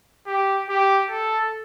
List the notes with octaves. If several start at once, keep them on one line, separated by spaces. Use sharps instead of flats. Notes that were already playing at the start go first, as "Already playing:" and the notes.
G4
G4
A4